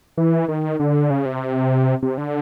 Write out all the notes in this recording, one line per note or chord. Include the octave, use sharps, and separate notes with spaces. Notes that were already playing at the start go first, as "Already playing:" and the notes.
E3
D#3
D3
C#3
C3
C3
D3